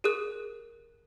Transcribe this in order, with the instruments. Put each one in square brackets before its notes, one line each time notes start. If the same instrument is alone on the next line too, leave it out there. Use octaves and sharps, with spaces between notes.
[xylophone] G4 G#4 A#4 D#6 F#6